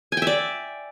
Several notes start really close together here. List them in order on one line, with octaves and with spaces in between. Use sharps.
G#5 G5 E5 D5